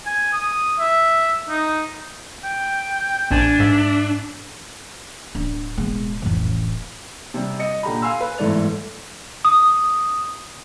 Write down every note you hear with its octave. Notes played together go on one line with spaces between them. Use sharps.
G#5
D#6
E5
D#4
G5
A#1 D4 G#5
G#2 E5
D1 D4
B2 G#3
A1 F2
C3 G3
D#5 C#7
A#2 D3 G4 A#5 B5
F5 G#5 C6 E6
B4
G1 G#2 E3 A3 D5 F7
D#6